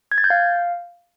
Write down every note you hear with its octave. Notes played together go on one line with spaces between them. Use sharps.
G#6
A6
G6
F5